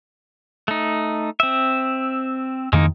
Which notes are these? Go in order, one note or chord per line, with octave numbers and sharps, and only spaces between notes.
A3 D#4
C4 E5
F2 D#3 G#3 A#3 D#4